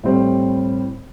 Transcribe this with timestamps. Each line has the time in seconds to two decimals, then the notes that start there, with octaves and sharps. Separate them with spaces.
0.03 A2 G3 C4